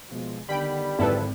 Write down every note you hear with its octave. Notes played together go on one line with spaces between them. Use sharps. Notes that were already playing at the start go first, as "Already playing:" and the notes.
B2 F3 G#3
D3 D#3 G3 B3 G5 B5
G#1 D3 F3 C4 E4 A4 B4